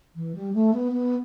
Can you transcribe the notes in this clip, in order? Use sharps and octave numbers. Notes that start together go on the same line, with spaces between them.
E3
G3
A3
B3
B3